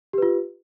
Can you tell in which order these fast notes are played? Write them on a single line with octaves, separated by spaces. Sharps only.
G4 B4 F4